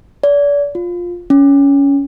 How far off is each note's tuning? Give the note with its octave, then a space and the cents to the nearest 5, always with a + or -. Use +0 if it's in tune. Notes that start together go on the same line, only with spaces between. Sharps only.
D5 -35
F4 +10
C#4 +15